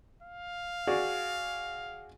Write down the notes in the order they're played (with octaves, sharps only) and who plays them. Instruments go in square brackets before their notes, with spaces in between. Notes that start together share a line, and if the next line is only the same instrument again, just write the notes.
[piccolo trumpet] F5
[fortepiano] F#4 G#4 D5